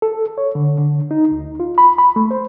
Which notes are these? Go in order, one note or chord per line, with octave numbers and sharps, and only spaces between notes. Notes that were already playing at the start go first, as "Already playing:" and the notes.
A4
C#5
D3
D3
D#4
D2
F4
B5
B5
A3
C5